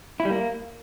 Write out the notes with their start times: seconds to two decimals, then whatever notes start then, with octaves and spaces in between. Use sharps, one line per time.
0.20 E4
0.25 G3
0.30 A#3